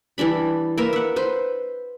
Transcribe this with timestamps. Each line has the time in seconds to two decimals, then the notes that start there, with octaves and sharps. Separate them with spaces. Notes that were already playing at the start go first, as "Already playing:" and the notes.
0.18 E3 G3 D4 B5
0.78 A#3 A#4 B4 E5
0.93 E5 F#5
1.16 B4 C5